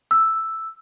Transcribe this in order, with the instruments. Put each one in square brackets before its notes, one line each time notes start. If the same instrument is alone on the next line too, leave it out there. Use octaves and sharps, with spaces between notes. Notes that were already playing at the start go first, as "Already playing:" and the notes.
[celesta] E6